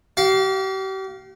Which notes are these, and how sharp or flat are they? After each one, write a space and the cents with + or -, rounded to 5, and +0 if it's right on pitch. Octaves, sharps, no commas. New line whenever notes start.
G4 -40 F5 +0